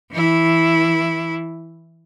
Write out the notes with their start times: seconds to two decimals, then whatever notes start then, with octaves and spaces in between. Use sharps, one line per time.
0.12 E3 E4